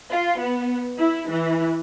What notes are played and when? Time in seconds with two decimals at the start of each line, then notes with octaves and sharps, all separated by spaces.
0.11 F4
0.39 B3
0.98 E4
1.29 E3